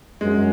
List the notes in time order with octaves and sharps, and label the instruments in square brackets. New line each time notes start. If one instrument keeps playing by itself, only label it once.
[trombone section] F#2 [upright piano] G#3